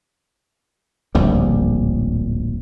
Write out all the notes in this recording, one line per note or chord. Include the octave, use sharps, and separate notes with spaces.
D1 A#1 D#2 G3